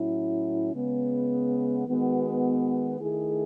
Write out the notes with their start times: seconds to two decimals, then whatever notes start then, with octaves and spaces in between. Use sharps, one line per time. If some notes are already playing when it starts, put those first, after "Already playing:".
Already playing: A2 F#3 C#4 E4
0.72 C#3 G#3 B3
1.86 D#3 G#3 B3 F#4
2.99 D#3 A3 E4 G#4